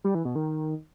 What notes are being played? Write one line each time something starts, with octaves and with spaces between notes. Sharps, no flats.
G3
E3
B2
D#3